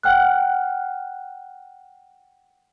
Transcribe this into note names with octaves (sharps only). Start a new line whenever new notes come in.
F#5 G5 F6 F#6